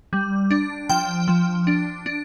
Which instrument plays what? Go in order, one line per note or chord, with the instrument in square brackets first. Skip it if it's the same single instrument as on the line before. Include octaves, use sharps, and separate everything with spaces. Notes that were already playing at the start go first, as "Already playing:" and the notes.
[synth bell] G3
D4
F3 G5
F3
D4
D4